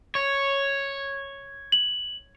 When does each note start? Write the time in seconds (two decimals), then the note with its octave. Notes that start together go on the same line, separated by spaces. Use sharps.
0.15 C#5
1.72 F#7